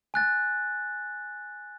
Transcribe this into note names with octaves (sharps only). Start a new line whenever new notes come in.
G#5 F#6 A6